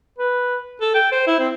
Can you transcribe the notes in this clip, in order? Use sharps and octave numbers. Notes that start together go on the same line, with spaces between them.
B4
A4
G5
C5
E4
C4